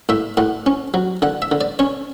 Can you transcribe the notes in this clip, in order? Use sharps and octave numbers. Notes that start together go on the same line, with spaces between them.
A2 E5
A2 F#5
C#4
F#3
D3 F#5
E5
D3
D5
C#4 C#5